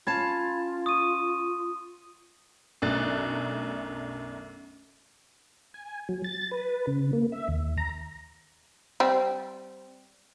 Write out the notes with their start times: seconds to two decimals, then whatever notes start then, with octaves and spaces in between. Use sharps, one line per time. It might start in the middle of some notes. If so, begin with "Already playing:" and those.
0.07 C#4 F4 F5 A5 B5 G#6 A6
0.86 C#6 D#6 D#7
2.82 B1 F#2 A3 D4 F#6 A6
5.74 G#5
6.09 F#3
6.24 A6
6.51 B4
6.87 C#3
7.13 A#3
7.32 E5
7.48 D#2
7.78 A#5
9.00 G3 C4